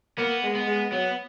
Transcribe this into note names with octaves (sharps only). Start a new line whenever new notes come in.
A#3 B3
G#3
B3
G#3
F#3 B3